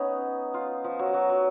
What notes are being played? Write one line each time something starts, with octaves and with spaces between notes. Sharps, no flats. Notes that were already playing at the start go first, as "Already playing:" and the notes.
Already playing: B3 C#4 D#4
F4
F3
F#3
F#3
F#3